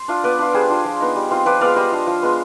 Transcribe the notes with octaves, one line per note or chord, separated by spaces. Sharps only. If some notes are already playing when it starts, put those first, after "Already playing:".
Already playing: C5
D4 F4
B3 B4 D5
D4 F4
G3 G#4 C5
D4 F4
F3
B3 D#4
G3
C4 F4
F3 B4 D5
G#3 B3 D5 F5
G3 C5 D#5
D4 F4
F3
G#3 B3